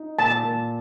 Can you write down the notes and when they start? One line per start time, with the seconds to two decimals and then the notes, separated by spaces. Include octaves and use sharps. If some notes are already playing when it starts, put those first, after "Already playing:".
Already playing: D#4
0.19 A#2 A5
0.43 A#2